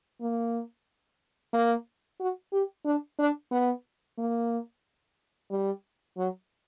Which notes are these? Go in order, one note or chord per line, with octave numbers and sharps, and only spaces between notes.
A#3
A#3
F#4
G4
D4
D4
B3
A#3
G3
F#3